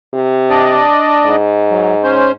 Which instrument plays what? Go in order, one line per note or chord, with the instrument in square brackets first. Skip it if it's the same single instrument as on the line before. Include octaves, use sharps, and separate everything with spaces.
[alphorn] C3
[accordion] D4 D5 D#5
[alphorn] G#2
[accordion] F#3
C#4 C5